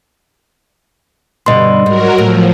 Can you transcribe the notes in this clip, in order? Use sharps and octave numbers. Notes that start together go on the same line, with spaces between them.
G2 B2 D3 D#5 C6
G#2 F#3 F#4 A#4
A2 F3